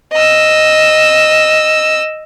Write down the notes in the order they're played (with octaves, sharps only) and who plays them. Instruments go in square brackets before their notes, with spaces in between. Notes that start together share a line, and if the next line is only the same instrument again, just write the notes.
[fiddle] D#5 E6